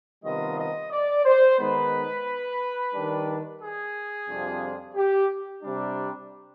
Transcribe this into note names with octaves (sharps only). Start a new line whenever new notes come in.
C3 D#3 G3 B3 F4 D#5
D#5
D5
C5
D#3 G#3 B3 D#4 B4
D#3 G3 D4
G#4
F2 C3 G3 D4 F4
G4
C3 G3 D4